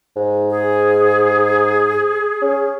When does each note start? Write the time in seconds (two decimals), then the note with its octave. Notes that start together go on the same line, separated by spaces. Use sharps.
0.16 G#2
0.50 G#4
2.42 C#4